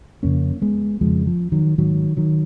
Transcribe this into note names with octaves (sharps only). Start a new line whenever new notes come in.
F2 C#3 A#3 C#4
G#3 B3
F2 C#3 F3 G#3
F3
D#3 F#3
G#2 D#3 F#3
D#3 F#3